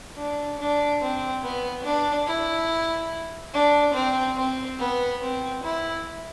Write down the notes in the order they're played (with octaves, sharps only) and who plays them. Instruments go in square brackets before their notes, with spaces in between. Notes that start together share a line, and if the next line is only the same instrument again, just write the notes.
[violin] D4
D4
C4
B3
D4
E4
D4
C4
C4
B3
C4
E4